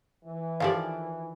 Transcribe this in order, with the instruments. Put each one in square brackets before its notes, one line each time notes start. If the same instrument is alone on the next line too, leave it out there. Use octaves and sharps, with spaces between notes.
[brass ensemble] E3
[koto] D#3 F3 D5 [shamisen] G4 A4 F5